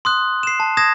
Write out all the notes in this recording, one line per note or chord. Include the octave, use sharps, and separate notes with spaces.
C6 D#6 F#6
C7 E7
A5
D#6 G#6 A#6 E7